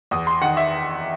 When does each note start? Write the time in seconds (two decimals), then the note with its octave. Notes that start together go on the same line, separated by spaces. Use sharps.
0.11 E2 D#6
0.27 C6
0.41 D#3 F#5
0.57 E5